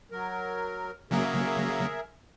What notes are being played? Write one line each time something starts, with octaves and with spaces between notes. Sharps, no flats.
F#3 A#4
C#3 F#3 A#3 G#4 A#4 E5